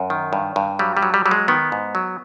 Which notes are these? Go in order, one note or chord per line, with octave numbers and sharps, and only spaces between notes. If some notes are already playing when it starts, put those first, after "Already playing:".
Already playing: F#2
D#3
G2
G2
F#3 G3
G3
F#3
G3
F#3 G3
G#3
D#3 B3
G#2
F#3